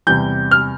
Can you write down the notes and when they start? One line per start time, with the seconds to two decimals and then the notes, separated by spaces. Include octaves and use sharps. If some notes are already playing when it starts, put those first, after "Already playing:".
0.07 E2 C3 G3 G6
0.51 F6